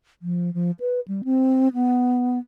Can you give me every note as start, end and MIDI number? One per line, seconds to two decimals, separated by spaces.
0.22 0.53 53
0.54 0.71 53
0.80 1.00 71
1.08 1.22 55
1.24 1.68 60
1.74 2.39 59